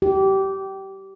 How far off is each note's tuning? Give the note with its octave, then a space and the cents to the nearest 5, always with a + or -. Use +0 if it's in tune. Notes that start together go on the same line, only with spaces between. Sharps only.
G4 -20